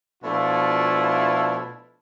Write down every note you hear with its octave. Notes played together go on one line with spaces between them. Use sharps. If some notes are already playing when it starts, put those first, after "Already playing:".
B2 F3 A3 D4 E4 F4